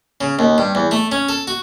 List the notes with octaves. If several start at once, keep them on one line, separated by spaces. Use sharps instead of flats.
C#3
D#2
G2
E2
A3
C#4
A4
F#4